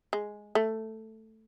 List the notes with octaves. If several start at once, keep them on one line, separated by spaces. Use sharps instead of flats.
G#3
A3